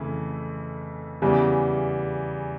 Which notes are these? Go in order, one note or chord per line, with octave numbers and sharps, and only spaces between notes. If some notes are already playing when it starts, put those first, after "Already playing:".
Already playing: F2 C#3 E3 A3
E2 C#3 E3 G3